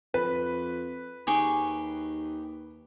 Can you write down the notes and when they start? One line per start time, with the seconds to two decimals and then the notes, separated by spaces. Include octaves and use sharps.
0.14 F2 B4
1.27 D#2 G4 G#4 C#6